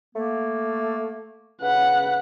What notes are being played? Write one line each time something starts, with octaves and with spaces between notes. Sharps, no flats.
A3 A#3
C#3 B4 F#5